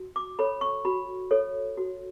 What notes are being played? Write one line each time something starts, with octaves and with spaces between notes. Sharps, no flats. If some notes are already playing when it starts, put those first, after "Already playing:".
Already playing: F#4
D6
A4 C#5 B5
C#6
F#4 B5
A4 C#5
F#4